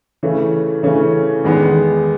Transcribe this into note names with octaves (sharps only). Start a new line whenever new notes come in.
C#3 E3 A3 C#4
C#3 E3 A3 C#4
E2 D#3 G#3 B3